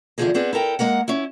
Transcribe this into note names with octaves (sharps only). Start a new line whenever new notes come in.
E2 D3 D#3 F3 G#4 D#5
B3 C4 D4 G#4
E4 A4 A#4 G5
G#3 A#3 A#4 F#5
C#4 E4